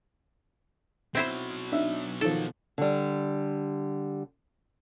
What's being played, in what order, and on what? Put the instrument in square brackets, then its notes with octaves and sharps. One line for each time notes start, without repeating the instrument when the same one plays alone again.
[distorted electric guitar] B2 F#3 [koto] C4 E4 C5
[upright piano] D4 D#4 E5
[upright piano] D#3 F3 [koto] A4
[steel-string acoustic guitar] D3 G3